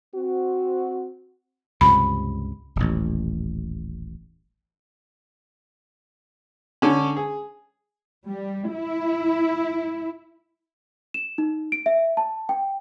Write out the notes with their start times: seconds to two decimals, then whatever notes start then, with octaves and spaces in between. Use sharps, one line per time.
0.15 C4 F#4
1.81 C#2 G2 C3 B5
2.76 D#1 A1
6.82 D3 C#4
7.17 G#4
8.27 G3
8.73 E4
11.14 E7
11.38 D#4
11.72 D7
11.86 E5
12.17 A5
12.49 G5